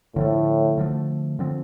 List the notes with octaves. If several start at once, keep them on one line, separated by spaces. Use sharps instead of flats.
A2 D3 F3 A3
D3 F3 A3
D3 F3 C4